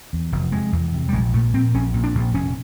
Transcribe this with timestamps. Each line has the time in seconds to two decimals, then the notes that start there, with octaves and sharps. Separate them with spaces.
0.13 E2
0.32 F1
0.52 C3 G#3
0.72 E2
0.94 C3
1.09 G3
1.13 A#1 G#3
1.34 A#2 A3
1.53 A#2 C4
1.74 A#1 C#4
1.94 A#2
2.04 D4
2.15 A#1
2.34 F1 C#4